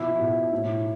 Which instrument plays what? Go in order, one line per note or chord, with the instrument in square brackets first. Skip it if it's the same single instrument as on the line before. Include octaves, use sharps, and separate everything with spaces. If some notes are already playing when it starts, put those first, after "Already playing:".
Already playing: [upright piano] B2 F3 E4
B2
A2